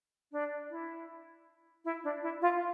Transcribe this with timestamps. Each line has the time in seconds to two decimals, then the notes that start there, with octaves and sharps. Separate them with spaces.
0.31 D4
0.70 E4
1.84 E4
2.03 D4
2.22 E4
2.41 F4